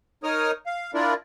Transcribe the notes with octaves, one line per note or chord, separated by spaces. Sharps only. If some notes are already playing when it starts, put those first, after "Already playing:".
D#4 A#4 C#5 D#6 F6
F5
D4 E4 F4 A#4 D5